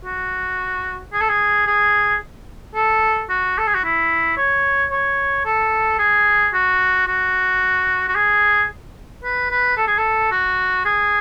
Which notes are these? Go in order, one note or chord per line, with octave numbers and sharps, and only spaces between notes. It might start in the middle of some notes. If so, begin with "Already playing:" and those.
F#4
G#4
A4
G#4
G#4
A4
F#4
A4
G#4
F#4
E4
C#5
C#5
A4
G#4
F#4
F#4
F#4
G#4
B4
B4
A4
G#4
A4
F#4
G#4